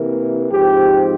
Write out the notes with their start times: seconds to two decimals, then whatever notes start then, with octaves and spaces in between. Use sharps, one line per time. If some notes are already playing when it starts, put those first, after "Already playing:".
Already playing: C3 E3 A#3
0.50 G#2 F3 C4 G4